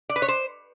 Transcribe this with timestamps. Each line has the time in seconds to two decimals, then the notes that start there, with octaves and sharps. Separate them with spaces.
0.09 D5
0.16 B4
0.22 C#5
0.28 C5